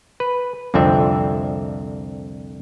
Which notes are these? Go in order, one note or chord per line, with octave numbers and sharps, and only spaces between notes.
B4
C2 F2 D3 C4 E5